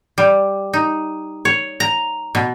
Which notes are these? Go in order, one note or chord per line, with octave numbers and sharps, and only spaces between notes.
G3
D#4
C#5
A#5
B2